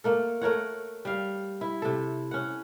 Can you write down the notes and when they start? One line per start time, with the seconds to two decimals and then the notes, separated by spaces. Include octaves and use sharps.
0.04 A3 A#3 A4
0.41 A3 A#4 C#5 F#5
1.05 G3 F5
1.61 E4
1.82 C3 A4
2.31 C#4 F#5